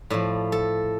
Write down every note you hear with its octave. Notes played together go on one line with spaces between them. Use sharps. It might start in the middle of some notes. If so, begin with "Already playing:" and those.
A2 F3 D5
A4